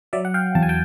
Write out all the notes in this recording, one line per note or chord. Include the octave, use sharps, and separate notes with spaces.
F#3 D5 E5
F#5
F5 G5
E2 A5
G#5
G5 A5